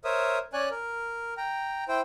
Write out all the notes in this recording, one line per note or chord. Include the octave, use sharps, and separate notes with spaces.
A#4 C5 C#5 E5 D#6
C#4 C#5 D5 G#5 F#6
A#4
G5 A#5
E4 C5 G5